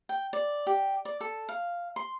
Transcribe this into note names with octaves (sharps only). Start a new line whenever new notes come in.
G5
D5
G4
D5
A4
F5
C6